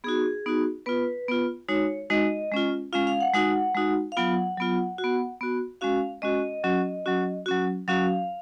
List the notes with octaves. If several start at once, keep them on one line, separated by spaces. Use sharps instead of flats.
B3 D#4 F#4 G#4
B3 D#4 F#4
B3 F4 B4
B3 F4
G#3 D#4 F#4 C#5
G#3 D#4 F#4 D#5
G#3 C#4 F4
G#3 C#4 F4 F5
F5
F#5
G#3 D#4 F#4 F#5
G#3 D#4 F#4
F5
F#3 B3 F4 F#5
F#3 B3 F4
F#4
B3
B3 F#4
G#3 C#4 F#4 F5
G#3 C#4 F#4 D#5
F#3 C#4 F#4
F#3 C#4 F#4
F#3 C#4 F#4
F#3 C#4 F#4 F5